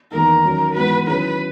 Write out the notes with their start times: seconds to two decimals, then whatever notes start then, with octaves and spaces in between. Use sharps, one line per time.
0.11 E2 D#3 A#3 D#4 A#4
0.43 D#3 F#3 C#4
0.75 G#2 E3 B3 F#4 B4
1.07 D#3 F#3 C#4 E4 G#4 B4